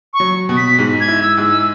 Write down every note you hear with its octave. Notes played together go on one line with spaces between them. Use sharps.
C#6
F#3
B2
B6
G#2
G#6
E4
E6
G#2
E6